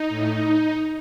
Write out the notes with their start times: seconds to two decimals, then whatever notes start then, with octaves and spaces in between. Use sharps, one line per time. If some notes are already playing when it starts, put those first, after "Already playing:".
Already playing: D#4
0.09 A2